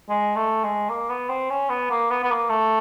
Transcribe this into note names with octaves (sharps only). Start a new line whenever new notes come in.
G#3
A3
G#3
A#3
B3
C4
C#4
B3
A#3
B3
B3
A#3
A3